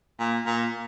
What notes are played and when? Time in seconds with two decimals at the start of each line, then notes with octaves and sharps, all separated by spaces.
0.19 A#2
0.46 A#2